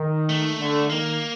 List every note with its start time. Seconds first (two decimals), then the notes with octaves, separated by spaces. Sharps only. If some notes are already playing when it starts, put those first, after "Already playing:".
Already playing: D#3
0.29 A3
0.59 D3
0.90 D#3 A#3